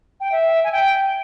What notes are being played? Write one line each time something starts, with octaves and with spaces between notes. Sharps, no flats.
G5
E5
G#5
G5